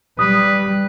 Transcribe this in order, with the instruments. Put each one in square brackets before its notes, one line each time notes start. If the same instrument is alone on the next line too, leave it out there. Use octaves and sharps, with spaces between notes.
[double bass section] G3 [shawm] B4 [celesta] D#6